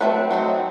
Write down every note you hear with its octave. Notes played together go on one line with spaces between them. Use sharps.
F#3 A3 C4 B4
F#3 A3 C4 D#4